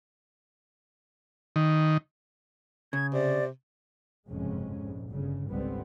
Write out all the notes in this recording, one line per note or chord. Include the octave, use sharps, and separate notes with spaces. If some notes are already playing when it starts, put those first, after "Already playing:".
D#3
C#3 G#6
C3 D5
F#1 F2 G#2 C3 G#3 C#4
A#1 G#2
G1 G2 C#3
G#1 C#2 D3 G3 B3 C4